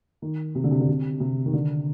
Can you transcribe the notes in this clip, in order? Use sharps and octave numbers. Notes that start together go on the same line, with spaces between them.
D#3
C3
D3
C3
D3
C3
C3
D#3
D3